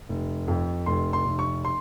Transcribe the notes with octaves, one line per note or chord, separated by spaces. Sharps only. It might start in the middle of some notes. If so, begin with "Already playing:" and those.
F1
F2
F1 C6
C6
F1
C#6
C6